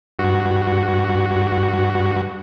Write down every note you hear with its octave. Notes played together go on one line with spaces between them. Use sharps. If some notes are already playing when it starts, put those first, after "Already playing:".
G2 F#4